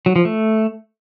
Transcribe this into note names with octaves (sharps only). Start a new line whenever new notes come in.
F#3
F3
A3